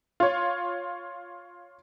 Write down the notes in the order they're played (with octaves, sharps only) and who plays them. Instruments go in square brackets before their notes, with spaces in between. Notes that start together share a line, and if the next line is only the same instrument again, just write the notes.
[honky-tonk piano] F4 C#5